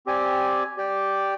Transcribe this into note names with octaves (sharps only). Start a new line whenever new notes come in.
C4 G4 D5 G#5
G4 D5 G5